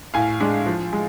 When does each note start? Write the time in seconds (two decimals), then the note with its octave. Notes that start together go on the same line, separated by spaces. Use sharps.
0.14 A2 F5 G#5
0.40 G#3 D4
0.67 F3
0.93 G#3